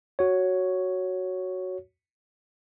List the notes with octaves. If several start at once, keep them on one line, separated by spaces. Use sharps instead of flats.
F#4 C#5